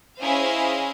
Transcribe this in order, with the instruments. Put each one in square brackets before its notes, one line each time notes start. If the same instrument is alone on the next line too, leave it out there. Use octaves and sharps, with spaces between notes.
[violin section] C#4 E4 G#4 C5 D#5 F5